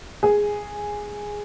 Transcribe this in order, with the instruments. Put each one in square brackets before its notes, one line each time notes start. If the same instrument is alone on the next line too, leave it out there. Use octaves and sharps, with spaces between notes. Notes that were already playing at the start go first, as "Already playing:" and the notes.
[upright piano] G#4